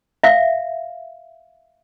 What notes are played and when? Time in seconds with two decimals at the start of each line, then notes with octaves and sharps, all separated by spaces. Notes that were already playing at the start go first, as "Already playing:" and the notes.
0.23 E5 F5